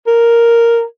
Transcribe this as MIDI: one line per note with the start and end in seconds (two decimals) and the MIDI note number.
0.07 0.84 70